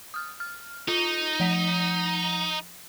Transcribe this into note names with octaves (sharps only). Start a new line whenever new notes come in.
D#6 F6
F6
D#4 F4
F3 F#5 B6